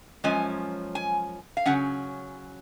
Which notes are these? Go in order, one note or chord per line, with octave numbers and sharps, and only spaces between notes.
F#2 F3 G#3 C#4 G#5
G#5
F5
C#3 F#3 C#4 F#5